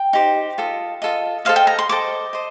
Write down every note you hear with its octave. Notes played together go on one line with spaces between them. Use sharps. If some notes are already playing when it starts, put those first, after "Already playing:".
Already playing: G5
D#4 G4 C5
F4 A4 D#5
F4 A4 D#5
A4 C5 D#5 F5
G5
A#5
C6
A4 C5 D#5 D6
C5 D#5